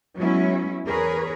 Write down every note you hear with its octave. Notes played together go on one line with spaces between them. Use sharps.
F#3 G#3 B3 C#4 E4
E2 G#4 A#4 B4 C#5